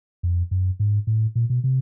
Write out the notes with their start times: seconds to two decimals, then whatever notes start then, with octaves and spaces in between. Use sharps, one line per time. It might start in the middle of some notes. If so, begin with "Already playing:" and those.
0.23 F2
0.51 F#2
0.80 G#2
1.07 A2
1.35 A#2
1.50 B2
1.64 C3